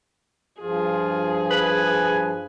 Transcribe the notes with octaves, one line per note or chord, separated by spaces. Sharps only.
G2 F3 F4 G#4
B4 G#5